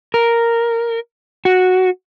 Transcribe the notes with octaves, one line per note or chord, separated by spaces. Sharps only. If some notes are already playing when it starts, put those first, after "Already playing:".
A#4
F#4